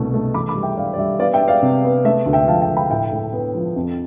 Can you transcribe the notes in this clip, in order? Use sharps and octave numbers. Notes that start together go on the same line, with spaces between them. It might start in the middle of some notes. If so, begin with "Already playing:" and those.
Already playing: C2 B2 A3
A3
E3 B5 D6
B5 D6
G3
E5 G5
G3 D5 F5
D5
G3 E5
B3 D5 F5
E5 G5
B3
D5 F5
C3
B3
A3 E5
D2
E5 G5
F3 F5 A5
E5 G5
D2
G5 B5
A2 E5 G5
A2
B3
F3
F2